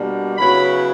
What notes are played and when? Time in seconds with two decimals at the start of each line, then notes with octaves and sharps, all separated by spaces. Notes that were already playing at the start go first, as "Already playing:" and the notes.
Already playing: B2 G3 A#3 D4
0.37 C#3 F#3 B3 E4 B5